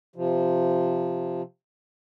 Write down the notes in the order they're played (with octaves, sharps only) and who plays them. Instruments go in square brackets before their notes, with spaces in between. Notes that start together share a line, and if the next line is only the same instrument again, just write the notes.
[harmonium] C3 F3